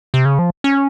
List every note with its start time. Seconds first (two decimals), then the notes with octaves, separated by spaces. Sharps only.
0.14 C3
0.25 C#3
0.39 F3
0.64 C#4